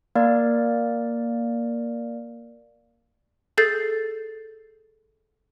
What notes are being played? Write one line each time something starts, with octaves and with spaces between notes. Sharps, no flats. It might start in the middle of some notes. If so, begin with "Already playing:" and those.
A#3 A#4 D5
G#4 A4 G6 A6 C7